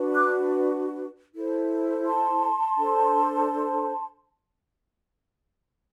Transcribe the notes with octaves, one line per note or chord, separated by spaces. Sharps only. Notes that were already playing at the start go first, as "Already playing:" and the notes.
Already playing: D4 F#4 B4
D6 F#6
E4 A4 C5
A5 C6
D4 A4 C5